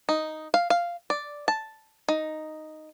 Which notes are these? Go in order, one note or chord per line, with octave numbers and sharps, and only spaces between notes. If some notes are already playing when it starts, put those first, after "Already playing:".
D#4
F5
F5
D5
A5
D#4